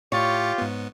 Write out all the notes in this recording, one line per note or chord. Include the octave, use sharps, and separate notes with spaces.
A2 F4 G4 C#5 A6 C#7
G#2 B3